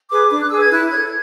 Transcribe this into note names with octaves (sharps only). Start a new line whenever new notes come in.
G#4 B4 D6
D4 D6
F#6
G#4 B4 E6
G#6
E4 F#6
C#5 G#6
A4